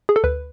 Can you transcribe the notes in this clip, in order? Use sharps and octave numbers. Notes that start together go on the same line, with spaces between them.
G#4
A4
D2 B4